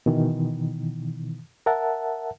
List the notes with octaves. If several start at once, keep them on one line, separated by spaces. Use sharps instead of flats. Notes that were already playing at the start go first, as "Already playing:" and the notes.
B2 D#3 E3
A#4 E5 F#5 A5